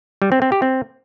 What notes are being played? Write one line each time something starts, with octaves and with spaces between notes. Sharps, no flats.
G3
C4
C4
G4
C4